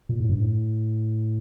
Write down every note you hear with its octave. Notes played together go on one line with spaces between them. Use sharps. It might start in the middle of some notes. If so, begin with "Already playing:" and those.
A#2
A2
G2
A2